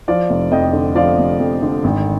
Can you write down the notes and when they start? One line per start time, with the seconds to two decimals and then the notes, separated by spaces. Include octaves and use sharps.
0.08 F3 D5 F5
0.30 F1
0.51 F2 D#5 G5
0.73 D3
0.95 F3 D5 F5
1.19 F1
1.39 F2
1.63 D3
1.84 G#1